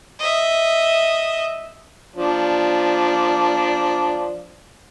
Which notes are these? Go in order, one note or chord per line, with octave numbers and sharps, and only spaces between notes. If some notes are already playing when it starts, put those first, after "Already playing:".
D#5 E5
F3 D4